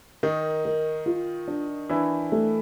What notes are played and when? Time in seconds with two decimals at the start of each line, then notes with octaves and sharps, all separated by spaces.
0.23 D#3 D#4 A#4
0.65 A#4
1.06 F4
1.48 D4
1.89 E3 D4 E4
2.32 A3